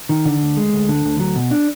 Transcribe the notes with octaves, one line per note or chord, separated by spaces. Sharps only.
D#3
D3
D2
G#3
D2
D3
D2
F#3
B2
D4